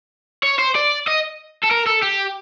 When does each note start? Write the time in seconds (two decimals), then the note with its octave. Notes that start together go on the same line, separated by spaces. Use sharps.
0.43 C#5
0.59 C5
0.75 D5
1.07 D#5
1.63 A4
1.71 A#4
1.86 A4
2.02 G4